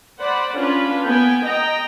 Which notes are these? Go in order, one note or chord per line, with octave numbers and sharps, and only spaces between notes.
C5 D5 F#5 B5
C#4 D4 F4 B4
B3 G5 G#5
D#5 G5 A#5